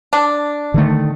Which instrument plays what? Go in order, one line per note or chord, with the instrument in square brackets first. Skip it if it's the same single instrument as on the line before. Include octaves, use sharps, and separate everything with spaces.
[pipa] D4
[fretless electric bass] D3 D#3 A3